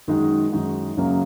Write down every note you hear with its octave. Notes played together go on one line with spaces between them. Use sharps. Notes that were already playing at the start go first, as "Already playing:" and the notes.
F#2 D#3 G#3 D#4 F#4
F#2 D#3 G#3 D#4 F#4
F#2 C#3 F#3 A#3